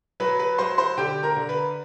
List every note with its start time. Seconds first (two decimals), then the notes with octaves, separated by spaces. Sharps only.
0.20 F#3 B4 B5
0.39 B4 B5
0.58 F#3 C5 C6
0.78 C5 C6
0.97 D3 G4 G5
1.23 A#4 A#5
1.37 D3
1.49 B4 B5